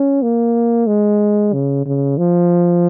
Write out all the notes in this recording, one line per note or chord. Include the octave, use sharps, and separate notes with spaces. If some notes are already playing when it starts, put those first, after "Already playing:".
Already playing: C#4
A#3
G#3
C#3
C#3
F3